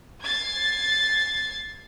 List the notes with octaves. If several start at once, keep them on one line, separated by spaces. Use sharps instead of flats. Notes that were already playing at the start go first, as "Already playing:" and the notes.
G#6 A6 C7